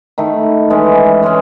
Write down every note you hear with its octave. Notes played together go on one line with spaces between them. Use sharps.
D#3 A3 E4
E3 G#3 C#4
E3 G#3 C#4